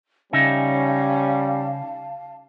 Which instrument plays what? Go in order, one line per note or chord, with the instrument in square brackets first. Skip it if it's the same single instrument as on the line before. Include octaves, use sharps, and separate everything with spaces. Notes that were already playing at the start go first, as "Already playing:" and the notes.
[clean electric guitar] C#3 D#4 E5 [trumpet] G3 [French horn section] C#4 [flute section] F5 A5